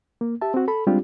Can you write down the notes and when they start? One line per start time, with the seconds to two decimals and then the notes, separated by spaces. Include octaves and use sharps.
0.21 A#3
0.41 G4 E5 A5
0.54 C4 F#4
0.68 A4 B5
0.87 G3 G#3 C4 D4 F4 G4